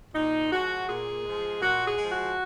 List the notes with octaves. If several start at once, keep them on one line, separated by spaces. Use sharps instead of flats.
A#2 D#4
F3 G#3 F#4
A#2 G#4
F3 G#3
A#2 F#4
G#4
F3 G#3
F#4